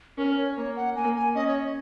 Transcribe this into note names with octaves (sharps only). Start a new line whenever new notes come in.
C#4 A#4
C#5
A#3 C#5
F#5
A#3 G#5
G#5
C#4 D#5
C#5